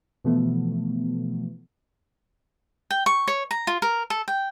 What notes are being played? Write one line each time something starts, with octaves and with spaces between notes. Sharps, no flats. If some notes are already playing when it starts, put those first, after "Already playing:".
B2 E3 F3 A3 B3
G5
C#6
C#5
A#5
F4
A#4
A4
G5